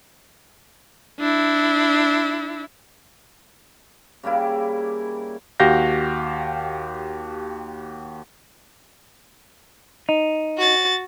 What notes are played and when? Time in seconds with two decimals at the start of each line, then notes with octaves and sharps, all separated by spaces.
1.20 D4 E4
4.23 C#3 G3 A#3 E4
5.60 D#2 F#4 G4 F5 G6 A#6
10.09 D#4
10.58 F#4 A6